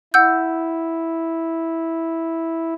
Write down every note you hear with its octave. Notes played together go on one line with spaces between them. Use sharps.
E4 F#5 E6 G6